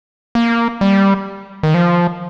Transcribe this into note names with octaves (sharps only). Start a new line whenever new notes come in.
A#3
G3
D#3
F3